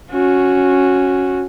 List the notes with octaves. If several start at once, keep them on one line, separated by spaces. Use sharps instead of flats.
C#4 F#4